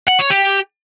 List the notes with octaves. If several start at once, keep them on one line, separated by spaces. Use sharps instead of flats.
F#5
C#5
G4